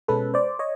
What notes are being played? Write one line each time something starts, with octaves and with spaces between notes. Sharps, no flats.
B2 G#3 C#4 A4 B4
C5 D5
C#5 D#5